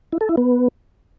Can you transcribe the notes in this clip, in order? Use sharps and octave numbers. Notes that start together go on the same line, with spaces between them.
E4
A4
E4
B3